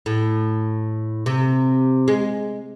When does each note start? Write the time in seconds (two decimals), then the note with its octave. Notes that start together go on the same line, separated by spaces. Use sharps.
0.06 A2
1.26 C3
2.08 G#3